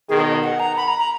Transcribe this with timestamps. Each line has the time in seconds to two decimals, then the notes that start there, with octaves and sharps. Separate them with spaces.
0.08 B2 D#3 G#4
0.20 D#5
0.43 F#5
0.60 A#5
0.77 B5
0.88 A#5
0.99 A#5